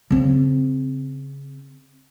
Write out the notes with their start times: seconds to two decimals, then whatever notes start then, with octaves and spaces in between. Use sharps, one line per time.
0.11 C#3 C4